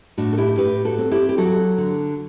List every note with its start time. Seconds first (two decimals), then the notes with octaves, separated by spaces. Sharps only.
0.18 A2 D4 F#4
0.33 A4
0.38 E4 G4
0.57 A2 G4 B4
0.85 F#4 A4
0.98 C4
1.12 E4 G4
1.29 G4
1.38 F#3 F#4 A4
1.78 D3